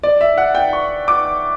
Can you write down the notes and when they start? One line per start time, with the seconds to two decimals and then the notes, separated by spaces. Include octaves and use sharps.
0.03 D5
0.21 E5
0.38 F#5
0.55 G5
0.73 C#6
1.08 D6